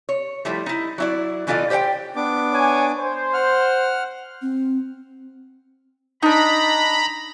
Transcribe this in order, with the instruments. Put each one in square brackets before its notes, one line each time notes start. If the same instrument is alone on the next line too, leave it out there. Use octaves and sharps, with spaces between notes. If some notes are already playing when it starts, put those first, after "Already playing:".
[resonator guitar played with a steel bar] C#5
F3 G3 A3 E4
D#4 E4
F#3 E4 D5
B2 E3 D#4 F4 A4 D5
G4 C5 D5 F#5 G5
[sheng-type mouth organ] B3 D4 D6
[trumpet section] C#5 G#5
C5
[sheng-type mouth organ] F#5 F6
[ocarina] C4
[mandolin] D4 D#4 [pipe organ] A#5 B5